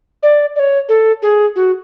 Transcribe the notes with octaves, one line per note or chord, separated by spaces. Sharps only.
D5
D5
C#5
A4
G#4
F#4